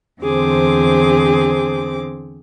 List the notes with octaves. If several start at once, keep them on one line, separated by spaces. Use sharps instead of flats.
E2 D3 C4 G#4 C5 D6